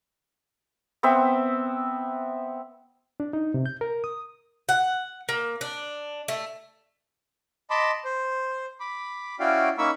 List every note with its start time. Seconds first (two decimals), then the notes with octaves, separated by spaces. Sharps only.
1.03 B3 C4 E5
3.20 D4
3.33 D#4
3.54 C3
3.66 G6
3.81 A#4
4.04 D#6
4.69 F#5
5.29 A#3
5.61 D4
6.28 A3
7.70 D#5 A5 B5 C6 D6
8.05 C5
8.80 B5 D6
9.40 C#4 E4 F#4 D5 F5 G5
9.78 A#3 C#4 D#4 B5 C#6 E6